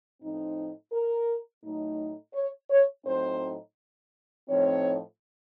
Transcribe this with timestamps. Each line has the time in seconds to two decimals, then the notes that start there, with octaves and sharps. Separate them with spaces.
0.21 A2 F3 C4 D#4
0.92 A#4
1.63 A2 F#3 A3 D#4
2.34 C#5
2.70 C#5
3.05 A2 F#3 C4 D#4 C5
4.48 A2 F3 C4 D#4 C#5